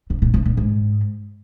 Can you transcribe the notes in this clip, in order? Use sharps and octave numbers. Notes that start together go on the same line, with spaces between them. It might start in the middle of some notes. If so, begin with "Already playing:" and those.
C3
A#2
C3
A#2
G#2